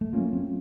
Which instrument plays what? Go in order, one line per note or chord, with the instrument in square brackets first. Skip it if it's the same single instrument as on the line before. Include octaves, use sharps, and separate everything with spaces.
[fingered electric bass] A3
[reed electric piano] F#3 A3 C#4 F4 [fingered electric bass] A#3
[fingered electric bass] C4